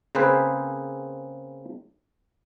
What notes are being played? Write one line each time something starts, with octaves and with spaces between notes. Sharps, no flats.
C#3 A#3 C4 G#4 B4 C5